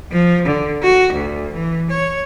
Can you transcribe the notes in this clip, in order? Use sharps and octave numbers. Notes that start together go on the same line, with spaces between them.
F3
D3
F#4
D2
E3
C#5